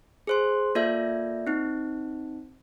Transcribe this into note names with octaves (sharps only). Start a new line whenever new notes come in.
G#4 C5 C6
A#3 F4 A4 D5 E5 G6
C4 D#4